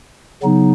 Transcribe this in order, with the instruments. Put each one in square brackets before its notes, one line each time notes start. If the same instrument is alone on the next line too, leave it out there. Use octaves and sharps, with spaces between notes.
[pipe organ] C#3 F#3 B3 D#4